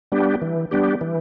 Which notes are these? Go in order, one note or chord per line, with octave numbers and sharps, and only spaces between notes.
G3 B3 D4 G4
E3
G3 B3 D4 G4
E3